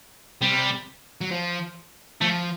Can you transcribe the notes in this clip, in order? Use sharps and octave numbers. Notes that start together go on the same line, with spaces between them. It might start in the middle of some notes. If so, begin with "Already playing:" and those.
C3 G3
F#3
F3
F3 A3